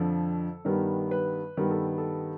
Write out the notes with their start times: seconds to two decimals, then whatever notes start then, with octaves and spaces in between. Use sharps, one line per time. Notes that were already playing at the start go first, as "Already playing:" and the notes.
Already playing: F2 D3 F3 A4
0.65 G2 D#3 G3 B3 A#4
1.11 B4
1.57 G2 D#3 G3 B3 A#4
1.71 A4
1.98 A4